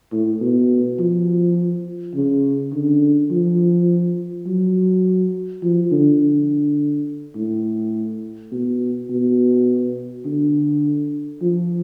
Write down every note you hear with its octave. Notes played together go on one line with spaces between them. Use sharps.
A2
B2
F3
C#3
D3
F3
F#3
F3
D3
D3
A2
B2
B2
D3
F3